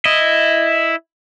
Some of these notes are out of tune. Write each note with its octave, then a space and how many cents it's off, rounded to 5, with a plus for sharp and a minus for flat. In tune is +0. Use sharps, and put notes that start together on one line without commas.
E4 +0 D#5 +0